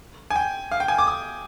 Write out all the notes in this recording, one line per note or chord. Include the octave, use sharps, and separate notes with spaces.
G#5
G5
F5
G5
G#5
D6
D#6